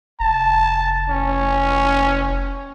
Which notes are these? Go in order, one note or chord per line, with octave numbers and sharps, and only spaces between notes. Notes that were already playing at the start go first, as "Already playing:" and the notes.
F1 A5
C#4